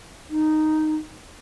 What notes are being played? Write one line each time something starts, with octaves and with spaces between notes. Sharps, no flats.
D#4